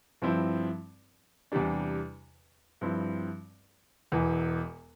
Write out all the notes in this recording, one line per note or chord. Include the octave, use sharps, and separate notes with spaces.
G2 F3 C4 E4
E2 C3 E3 G3 D4
G2 F3 C4 E4
E1 E2 E3